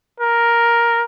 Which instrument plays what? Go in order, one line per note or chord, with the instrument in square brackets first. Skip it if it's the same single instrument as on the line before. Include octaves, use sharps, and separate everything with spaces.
[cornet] A#4